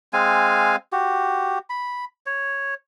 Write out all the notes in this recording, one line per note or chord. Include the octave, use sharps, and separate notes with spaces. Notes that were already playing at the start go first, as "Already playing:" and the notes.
G#3 C4 F5 G#5
F#4 G4
B5
C#5